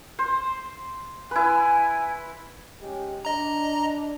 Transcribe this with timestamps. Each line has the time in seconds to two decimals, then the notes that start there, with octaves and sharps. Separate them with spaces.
0.19 C5
1.31 E4 B4 G#5
2.82 G#3 C#4 G4
3.25 D4 D#5 A#5